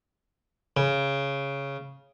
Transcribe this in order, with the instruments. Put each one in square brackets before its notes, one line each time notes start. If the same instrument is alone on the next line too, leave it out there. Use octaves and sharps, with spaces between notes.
[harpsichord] C#3